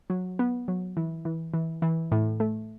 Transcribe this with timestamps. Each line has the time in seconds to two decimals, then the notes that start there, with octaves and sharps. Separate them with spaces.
0.10 F#3
0.39 B3
0.68 F#3
0.97 E3
1.25 E3
1.54 E3
1.82 E3
2.12 A2
2.40 A3